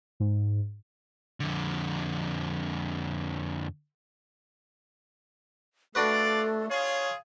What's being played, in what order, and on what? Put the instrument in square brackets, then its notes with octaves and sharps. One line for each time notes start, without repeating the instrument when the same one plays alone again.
[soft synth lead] G#2
[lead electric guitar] F2 D3
[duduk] A3 [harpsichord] D4 F#4 B4 [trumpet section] F4 D5 [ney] A4
[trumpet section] F4 G#4 [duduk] C#5 [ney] F5